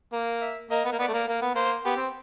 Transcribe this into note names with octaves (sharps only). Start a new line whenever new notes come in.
A#3
E5
A#3 D#5
B3
A#3
B3 D5
A3
A#3
A#3
B3
A#3 C5
B3 G4
C4